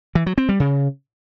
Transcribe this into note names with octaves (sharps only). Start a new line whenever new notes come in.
E3
F#3
C4
G3
C#3